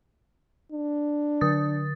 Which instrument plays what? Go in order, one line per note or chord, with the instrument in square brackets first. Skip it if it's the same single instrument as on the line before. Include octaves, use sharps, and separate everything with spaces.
[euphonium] D4
[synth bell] D3 D#6 A6